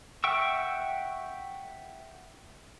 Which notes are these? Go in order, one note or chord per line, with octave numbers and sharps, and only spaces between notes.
E5 F#5 G5 C#6 E6